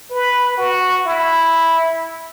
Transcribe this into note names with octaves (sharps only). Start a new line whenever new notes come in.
B4
F#4
E4